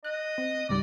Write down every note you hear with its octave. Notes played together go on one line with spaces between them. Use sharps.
D#5 F#6
C4
C#2 G#2 G3 D5